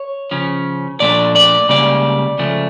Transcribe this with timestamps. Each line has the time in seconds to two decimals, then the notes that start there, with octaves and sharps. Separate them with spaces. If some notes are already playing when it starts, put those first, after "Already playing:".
Already playing: C#5
0.31 C#3 F3 C#4
1.00 A#2 F3 A3 D4 D5
1.36 D5
1.69 C#2 C#3 G3 A#3 D5
2.39 C#2 C#3 F3 A3